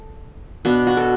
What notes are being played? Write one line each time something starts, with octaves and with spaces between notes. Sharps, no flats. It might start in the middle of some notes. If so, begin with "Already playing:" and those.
Already playing: A4
B2 B3 D4
F#4
A4